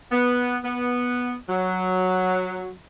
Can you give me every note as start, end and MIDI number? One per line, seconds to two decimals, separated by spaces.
0.11 0.56 59
0.63 1.33 59
1.49 2.70 54